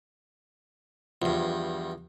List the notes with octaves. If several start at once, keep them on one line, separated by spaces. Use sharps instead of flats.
E2 G2 F3